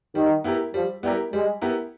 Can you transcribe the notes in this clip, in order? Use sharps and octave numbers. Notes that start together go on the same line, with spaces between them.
D#3 G3
B3 E4 G4 A#4
F3 G3
G3 B3 E4 G4 A#4
G3 G#3
B3 E4 G4 A#4